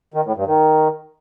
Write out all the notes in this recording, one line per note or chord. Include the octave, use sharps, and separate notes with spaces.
D#3
A2
G2
D#3